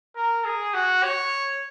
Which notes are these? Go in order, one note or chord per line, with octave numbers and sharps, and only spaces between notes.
A#4
G#4
F#4
C#5